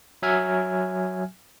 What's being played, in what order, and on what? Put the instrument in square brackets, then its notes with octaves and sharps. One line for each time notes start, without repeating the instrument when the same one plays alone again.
[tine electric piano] F#3 E5 G#5 F6 G#6